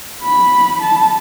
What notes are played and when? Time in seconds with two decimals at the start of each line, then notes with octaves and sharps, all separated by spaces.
0.22 B5
0.81 A5